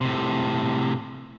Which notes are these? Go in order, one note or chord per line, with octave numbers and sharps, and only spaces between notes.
A2 C3